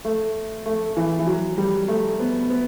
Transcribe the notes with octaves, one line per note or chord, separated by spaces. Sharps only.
A3
A3
E3
E3
F#3
G3
A3
B3
B3